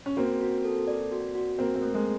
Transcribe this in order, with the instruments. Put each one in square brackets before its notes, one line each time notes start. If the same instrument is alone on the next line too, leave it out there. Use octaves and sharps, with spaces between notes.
[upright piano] C#4
[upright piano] A#3 C4 [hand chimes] F#4
[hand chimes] F#4
A4
D5
F#4
F#4
[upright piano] A#3 C4 [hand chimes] A#4
[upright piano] A#3 C4
[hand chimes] A3
[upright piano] G#3 A#3